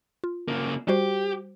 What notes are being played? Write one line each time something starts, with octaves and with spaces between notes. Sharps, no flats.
F4
C#3 A#3
G3 F#4 G4 C5